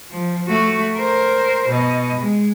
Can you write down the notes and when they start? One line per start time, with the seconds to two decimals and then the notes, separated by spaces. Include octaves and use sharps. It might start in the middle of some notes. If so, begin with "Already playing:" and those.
0.11 F3
0.48 A3 F#4
0.97 A#4 C5
1.69 B2 D#5
2.21 G#3